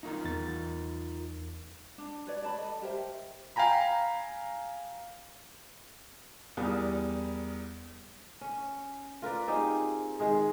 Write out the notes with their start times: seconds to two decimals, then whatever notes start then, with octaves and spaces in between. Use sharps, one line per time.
0.03 D#4 F4 A#4
0.24 E2 A6
1.98 D4
2.27 B4 C#5 D5
2.42 D5 A5 B5
2.58 A4 D#5
2.82 G4 A#4 C5 E5
3.56 F5 G5 G#5 A#5 B5
6.57 E2 G3 A#4 D#6
8.41 C#4
9.22 F4 A#4 B4 D5
9.47 C4 D#4 G4 G#4
10.19 D#3 G#3 G#4